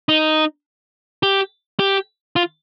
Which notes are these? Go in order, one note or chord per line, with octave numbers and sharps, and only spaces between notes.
D#4
G4
G4
F4